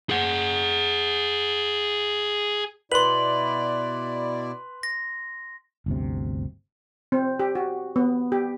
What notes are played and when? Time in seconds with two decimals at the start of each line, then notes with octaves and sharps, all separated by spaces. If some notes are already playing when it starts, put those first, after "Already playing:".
0.10 G#4 F#5
2.92 B2 E4 B4 D5 C6 F#7
4.83 A#6
5.86 G1 D2 C3
7.12 C4
7.40 G4
7.55 F#4
7.96 B3
8.32 G4